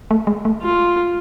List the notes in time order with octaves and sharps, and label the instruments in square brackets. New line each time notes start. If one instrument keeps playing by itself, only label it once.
[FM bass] A3
G#3
A3
[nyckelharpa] F4